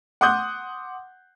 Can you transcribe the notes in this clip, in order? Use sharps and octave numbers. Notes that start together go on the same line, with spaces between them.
F#5 C6 D6 D#6 F#6 G6